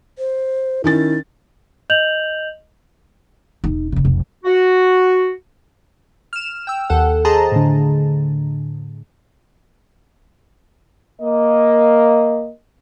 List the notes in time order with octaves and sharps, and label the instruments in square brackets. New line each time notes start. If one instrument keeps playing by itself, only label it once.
[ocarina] C5
[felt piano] D#3 C#4 A6 [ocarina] E4
[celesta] D#5 G6 F7 F#7
[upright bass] E1 D#4
E1 C#3
F1 B1
[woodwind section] F#4
[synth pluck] F6 E7
G5 E6
D#2 A4 F#5
G#4 C5 D#5 A5 A#5
A2 D3
[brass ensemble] A#3 D#5